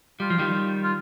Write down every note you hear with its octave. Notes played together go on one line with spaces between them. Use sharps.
G3 F4
F3
D#3 G3
F4